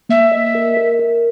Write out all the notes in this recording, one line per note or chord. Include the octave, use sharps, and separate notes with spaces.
A#3 E5
D#5
A#4
A#4
A#4